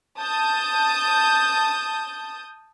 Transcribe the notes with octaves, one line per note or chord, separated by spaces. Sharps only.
A5 D#6 G6